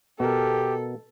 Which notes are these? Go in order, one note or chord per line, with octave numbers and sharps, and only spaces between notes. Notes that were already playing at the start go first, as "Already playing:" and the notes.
B2 G4 A4 A#4